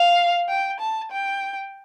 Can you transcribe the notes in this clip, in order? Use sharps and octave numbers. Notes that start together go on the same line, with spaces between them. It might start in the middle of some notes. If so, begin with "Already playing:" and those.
Already playing: F5
G5
A5
G5